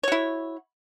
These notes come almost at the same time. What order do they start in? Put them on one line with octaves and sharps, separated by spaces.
C#5 F#4 E4